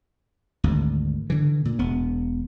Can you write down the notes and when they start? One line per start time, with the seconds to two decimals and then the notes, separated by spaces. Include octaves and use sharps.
0.64 G#1 D2
1.30 D3 E3
1.65 A#2
1.79 E1 B3